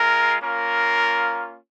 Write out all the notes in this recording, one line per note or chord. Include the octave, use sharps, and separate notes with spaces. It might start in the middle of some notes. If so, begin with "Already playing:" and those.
Already playing: G#3 F4 A#4
A#3 C#4 F4 A#4